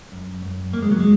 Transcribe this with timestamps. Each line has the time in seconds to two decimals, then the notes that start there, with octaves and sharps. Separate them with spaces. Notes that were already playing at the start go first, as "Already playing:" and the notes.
0.12 F#2
0.42 F#2
0.73 F#2 A#3
0.82 G#3
0.91 F#3
1.00 G#3